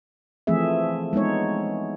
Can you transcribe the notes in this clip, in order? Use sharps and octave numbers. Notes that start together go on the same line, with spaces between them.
E3 F3 A3 C4 G#4 E5
G#3 B3 D#4 C#5